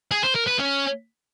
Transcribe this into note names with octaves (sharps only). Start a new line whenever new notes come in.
G#4
C5
A#4
B4
C#4